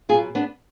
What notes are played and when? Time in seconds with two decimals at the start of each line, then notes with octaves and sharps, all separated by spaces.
0.09 F#3 F4 G#4
0.14 B2
0.35 B3 D4